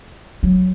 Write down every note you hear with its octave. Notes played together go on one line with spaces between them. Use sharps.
F#3